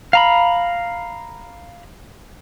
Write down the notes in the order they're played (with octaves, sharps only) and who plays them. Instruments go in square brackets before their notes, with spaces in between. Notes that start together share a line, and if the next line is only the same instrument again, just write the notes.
[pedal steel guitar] F5 A#5 B5